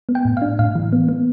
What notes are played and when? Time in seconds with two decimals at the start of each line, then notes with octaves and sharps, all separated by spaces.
0.09 B3
0.15 G5
0.25 A2
0.37 D4 F5
0.59 A2 F5
0.75 E3
0.92 B3
1.08 B3